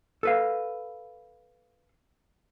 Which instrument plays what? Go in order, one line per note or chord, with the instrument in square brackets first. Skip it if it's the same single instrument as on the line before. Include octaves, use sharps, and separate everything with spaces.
[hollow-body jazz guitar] A4 B4 F5